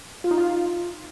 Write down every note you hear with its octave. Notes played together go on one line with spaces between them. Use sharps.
F4
D#4
F4